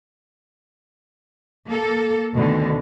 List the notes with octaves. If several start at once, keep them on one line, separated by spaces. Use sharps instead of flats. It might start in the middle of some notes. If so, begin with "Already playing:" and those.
A#3 A4
D2 B2 D3 D#3